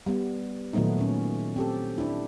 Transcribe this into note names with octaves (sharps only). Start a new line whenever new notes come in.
G3 B3
A#2 D#3 F#3 A3 B3 D#4
A#2 C#4
C4 G4 A4
D4 E4